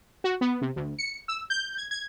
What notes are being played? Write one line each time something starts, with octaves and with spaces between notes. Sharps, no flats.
F#4
B3
C3
D2
C#7
E6
G6
G#6
G#6